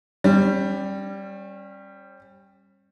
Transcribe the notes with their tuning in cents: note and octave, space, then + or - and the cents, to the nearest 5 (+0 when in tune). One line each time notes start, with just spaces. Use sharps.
G3 +0 C#4 -35